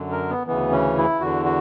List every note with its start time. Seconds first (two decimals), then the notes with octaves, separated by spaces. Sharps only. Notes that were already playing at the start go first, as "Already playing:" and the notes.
Already playing: F#2 D3
0.12 A#4
0.30 B3
0.47 D2 C#3 E3 B3
0.72 C#4
0.97 E4
1.20 E2 D3 F#4
1.45 F#4